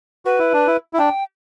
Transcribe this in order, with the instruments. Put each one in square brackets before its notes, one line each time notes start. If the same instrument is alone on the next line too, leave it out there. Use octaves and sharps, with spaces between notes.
[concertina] F#4 [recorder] B4
[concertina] E4
D4
E4
E4
[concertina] D4 [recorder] G5